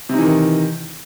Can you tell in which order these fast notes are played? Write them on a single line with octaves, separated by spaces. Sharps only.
C3 D#4 E3 D#3